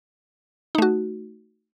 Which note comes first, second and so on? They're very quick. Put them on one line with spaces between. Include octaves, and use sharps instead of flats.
D#4 A3 F#4